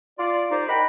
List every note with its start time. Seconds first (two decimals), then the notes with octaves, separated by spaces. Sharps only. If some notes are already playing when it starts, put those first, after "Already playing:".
0.19 F4 D5
0.51 C2 D#4 C5 D5
0.69 A#4 D#5 F#5 G5 A#5 B5